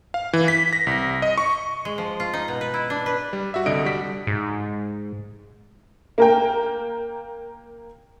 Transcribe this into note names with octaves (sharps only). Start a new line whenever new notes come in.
F5
E3
B6
A#6
C2
D#5
C#6
G#3
F3
F4
D#4
B2
B4
E4
D4
B4
G3
F#4 E5
C2 D3 D#5 D7
G3 F#4 B6
G#2
A#3 A#4 G5